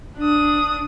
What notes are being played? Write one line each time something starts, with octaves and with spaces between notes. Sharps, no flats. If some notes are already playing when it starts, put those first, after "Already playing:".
D4 D#6